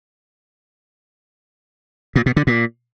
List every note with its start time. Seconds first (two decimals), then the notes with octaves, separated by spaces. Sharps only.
2.16 A#2
2.26 B2
2.36 D3
2.47 A#2